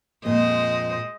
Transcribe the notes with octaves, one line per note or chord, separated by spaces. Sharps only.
F2 A#2 G#3 C5 D#5